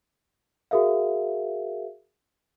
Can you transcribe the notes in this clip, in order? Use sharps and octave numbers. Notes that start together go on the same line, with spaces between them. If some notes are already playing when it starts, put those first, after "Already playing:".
F#4 G#4 A#4 E5 F5